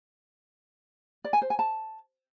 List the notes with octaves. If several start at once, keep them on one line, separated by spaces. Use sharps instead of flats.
D5
G#5
C5
G#5
A5